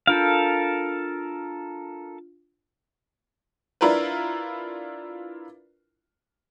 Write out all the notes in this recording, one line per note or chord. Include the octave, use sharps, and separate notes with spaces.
D4 F4 A4 A#4 F5 F6
D4 E4 F4 A#4 B4